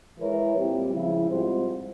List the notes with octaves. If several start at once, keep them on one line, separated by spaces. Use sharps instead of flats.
E3 G#3 E4 A#4 C#5
A#2 G3 C4 E4 G4
C#3 F3 G#3 E4
G#2 G3 C4 F4 C5